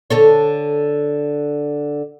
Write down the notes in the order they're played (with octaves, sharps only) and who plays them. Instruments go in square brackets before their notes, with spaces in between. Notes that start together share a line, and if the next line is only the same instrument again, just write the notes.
[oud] D3 A4 C#5